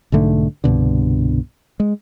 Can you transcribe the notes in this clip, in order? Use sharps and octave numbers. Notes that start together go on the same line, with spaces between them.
B1 G#2 D3 A3
C2 G2 B2 D3
G#3